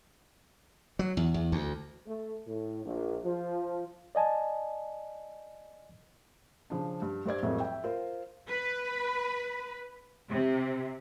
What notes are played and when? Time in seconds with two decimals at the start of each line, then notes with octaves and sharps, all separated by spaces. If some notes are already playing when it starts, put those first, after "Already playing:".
0.99 F#3
1.17 E2
1.34 E2
1.52 D2
2.07 A3
2.46 A2
2.85 A#1
3.24 F3
4.15 D5 D#5 G#5 A5
6.70 C#3 F3 D4
7.02 G2
7.26 G2 C5 D5 G#6
7.43 F2 A2 C3 F#3 G#3 A#3
7.60 E5 G5
7.84 F4 A#4 C5
8.47 B4
10.29 C3